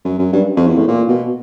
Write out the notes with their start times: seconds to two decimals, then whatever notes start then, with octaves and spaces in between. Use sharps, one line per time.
0.05 F#2
0.19 F#2
0.32 G2
0.57 F2
0.67 E2
0.78 A2
0.88 A#2
1.08 B2